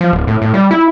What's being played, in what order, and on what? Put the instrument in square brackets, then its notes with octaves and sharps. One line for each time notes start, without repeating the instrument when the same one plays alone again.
[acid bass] F3
D1
A2
A2
G3
E4